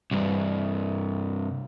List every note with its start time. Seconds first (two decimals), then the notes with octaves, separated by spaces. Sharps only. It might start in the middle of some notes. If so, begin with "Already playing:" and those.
0.11 C2 G2